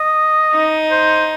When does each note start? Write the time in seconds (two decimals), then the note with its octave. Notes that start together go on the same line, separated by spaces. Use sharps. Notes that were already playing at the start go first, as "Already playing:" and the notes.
Already playing: D#5
0.54 D#4
0.91 C5